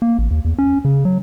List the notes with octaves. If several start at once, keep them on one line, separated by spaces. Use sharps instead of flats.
A#3
A1
D#2
E2
C#4
C#3
F#3